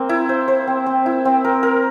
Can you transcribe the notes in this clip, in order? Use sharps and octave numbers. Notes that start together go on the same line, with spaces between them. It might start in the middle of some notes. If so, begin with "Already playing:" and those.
Already playing: A#3 C4
E4
C5
C5
C4
C4
E4
C4
A#4
A#4